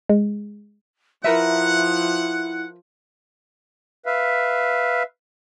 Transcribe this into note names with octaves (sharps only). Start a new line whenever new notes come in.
G#3
F3 E4 A#4 B4 E5 F#5
B4 E5 F5